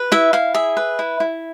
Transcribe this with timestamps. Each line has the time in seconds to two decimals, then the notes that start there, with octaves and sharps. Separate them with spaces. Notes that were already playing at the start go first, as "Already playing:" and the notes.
Already playing: B4
0.12 E4 E5
0.33 E4 F5
0.54 G#4 E5
0.77 B4
0.99 E4
1.20 E4